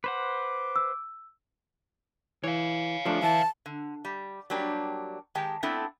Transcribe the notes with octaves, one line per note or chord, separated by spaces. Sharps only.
B4 C5 F#5 D6
E6
E3 C#5 F5
F3 A3 D4
E3 E4 A5
D3
G3
F#3 G3 A#3 D4 G4
D#3 G#3 G4 G5 A5
A3 B3 C4 D4 E4 A4